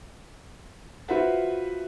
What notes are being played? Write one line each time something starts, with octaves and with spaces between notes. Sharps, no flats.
F4 F#4 B4 C5 E5 F#5